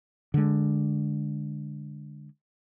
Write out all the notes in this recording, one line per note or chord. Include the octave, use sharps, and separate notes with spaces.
D3 G#3